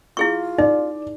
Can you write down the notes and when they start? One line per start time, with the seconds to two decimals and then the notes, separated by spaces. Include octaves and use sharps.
0.17 E4 F4 G#4 C#6
0.58 D#4 D5